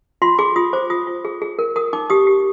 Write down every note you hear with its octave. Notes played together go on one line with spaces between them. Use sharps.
F4 C6
G#4 D6
F4 D#6
C5 D6
F4 D#6
F4
G#4
G#4
A#4
A#4 D#6
D#4 D6
G4 D#6
G4